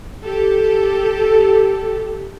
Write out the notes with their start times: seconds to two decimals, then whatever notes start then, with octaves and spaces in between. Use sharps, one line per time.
0.24 G4 A4